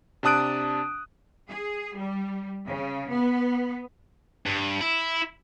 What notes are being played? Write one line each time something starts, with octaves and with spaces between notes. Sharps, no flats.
C3 D4 A5 D#6 F#6 D7
G#4
G3
C#3
B3
G2
E4